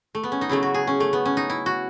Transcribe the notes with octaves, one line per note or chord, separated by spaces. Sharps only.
A3
B3
C#4
D#4
C#3 F#3 A3 E4
F#4
G#4
C#4
A3
B3
C#4
D#4
E4
F#4